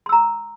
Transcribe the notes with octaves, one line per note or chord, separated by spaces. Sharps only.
A#5 C6 E6